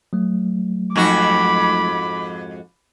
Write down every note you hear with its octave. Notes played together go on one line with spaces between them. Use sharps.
F#3 A3
F2 G#2 F#4 B5 D6